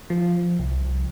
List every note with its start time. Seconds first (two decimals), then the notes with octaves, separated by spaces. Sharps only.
0.10 F3
0.59 C2